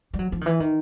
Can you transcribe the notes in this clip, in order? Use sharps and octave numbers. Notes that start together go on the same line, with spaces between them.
G3
F#3
F3
D#3
E3
D#3